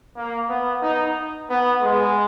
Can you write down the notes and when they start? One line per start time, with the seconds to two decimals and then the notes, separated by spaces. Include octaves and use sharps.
0.17 A#3
0.49 B3
0.82 D#4
1.49 B3
1.82 G#3